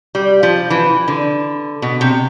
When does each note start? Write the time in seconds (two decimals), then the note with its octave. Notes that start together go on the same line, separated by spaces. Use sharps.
0.15 G3
0.43 F3
0.70 E3
1.08 D3
1.82 B2
2.01 C3